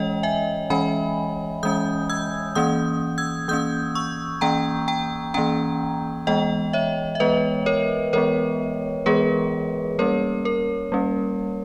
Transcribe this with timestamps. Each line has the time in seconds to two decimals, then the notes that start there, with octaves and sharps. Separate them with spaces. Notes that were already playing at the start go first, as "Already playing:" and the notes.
Already playing: E3 G#3 C#4 C#5 D#5 G5
0.23 E5 G#5
0.70 E3 G#3 C#4 G#5 B5
1.63 E3 G#3 C#4 D#6 G6
2.09 E6 G#6
2.55 E3 A#3 C#4 D#6 G6
3.18 E6 G#6
3.48 E3 A#3 C#4 D#6 G6
3.95 C#6 E6
4.41 E3 A#3 C#4 G5 A#5
4.88 G5 A#5
5.34 E3 A#3 C#4 G5 A#5
6.27 E3 G#3 B3 D#5 G5
6.73 C#5 E5
7.15 E5
7.20 E3 G#3 B3 B4 D#5
7.66 A#4 C#5
8.13 E3 G#3 B3 A#4 C#5
9.06 E3 G#3 B3 G#4 B4
9.99 G3 A#3 C#4 A#4 C#5
10.45 A#4
10.92 G3 A#3 C#4